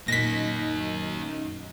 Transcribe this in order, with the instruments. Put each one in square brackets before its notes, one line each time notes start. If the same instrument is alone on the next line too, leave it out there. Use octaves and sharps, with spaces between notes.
[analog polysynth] F#2 D#4 [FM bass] A#2 [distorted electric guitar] A#3 D#5 [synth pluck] A#6 B6